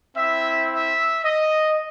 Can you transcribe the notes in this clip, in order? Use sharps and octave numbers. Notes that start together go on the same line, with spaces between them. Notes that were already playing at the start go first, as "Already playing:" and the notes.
C4 E4 E5
E5
D#5